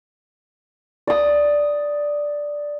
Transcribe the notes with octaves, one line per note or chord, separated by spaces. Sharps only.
D5 D#6